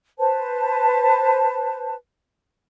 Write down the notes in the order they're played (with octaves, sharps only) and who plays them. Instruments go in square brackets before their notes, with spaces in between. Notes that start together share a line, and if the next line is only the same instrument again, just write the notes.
[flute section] B4 C5 A5